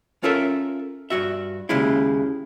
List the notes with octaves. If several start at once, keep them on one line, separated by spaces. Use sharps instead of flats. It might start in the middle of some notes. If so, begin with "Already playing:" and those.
C#4 F4 A4 A#4 E5
G2 C3 F#4 E5
D#2 C#3 G#3 E4